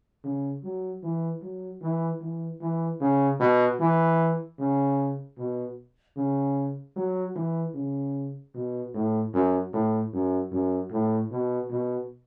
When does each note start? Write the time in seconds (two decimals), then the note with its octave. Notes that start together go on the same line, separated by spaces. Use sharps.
0.24 C#3
0.64 F#3
1.03 E3
1.42 F#3
1.81 E3
2.21 E3
2.61 E3
3.01 C#3
3.40 B2
3.80 E3
4.59 C#3
5.38 B2
6.17 C#3
6.96 F#3
7.36 E3
7.75 C#3
8.55 B2
8.94 A2
9.34 F#2
9.73 A2
10.13 F#2
10.52 F#2
10.91 A2
11.31 B2
11.71 B2